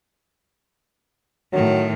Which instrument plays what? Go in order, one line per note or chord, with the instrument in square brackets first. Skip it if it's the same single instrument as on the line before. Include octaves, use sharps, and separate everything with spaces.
[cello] A2 D#3 [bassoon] F#3